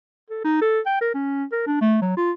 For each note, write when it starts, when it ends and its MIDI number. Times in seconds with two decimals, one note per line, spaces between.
0.30 0.44 69
0.44 0.58 63
0.61 0.80 69
0.86 1.01 79
1.01 1.10 70
1.14 1.44 61
1.52 1.63 70
1.67 1.78 62
1.81 2.00 57
2.02 2.16 54
2.17 2.32 65